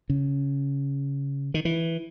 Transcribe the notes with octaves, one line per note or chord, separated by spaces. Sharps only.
C#3
D#3
E3